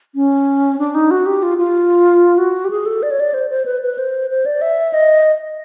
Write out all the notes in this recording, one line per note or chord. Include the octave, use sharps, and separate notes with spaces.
C#4
D4
D#4
F#4
G4
F4
F4
F#4
G4
G#4
A4
D5
C#5
D5
C5
C5
B4
B4
C5
C5
D5
E5
D#5